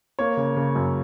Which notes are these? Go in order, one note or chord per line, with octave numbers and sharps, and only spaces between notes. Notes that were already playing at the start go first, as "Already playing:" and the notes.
A#3 C#5
C#3
C#3
F#2